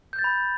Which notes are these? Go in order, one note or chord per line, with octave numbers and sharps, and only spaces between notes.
G6
A6
B5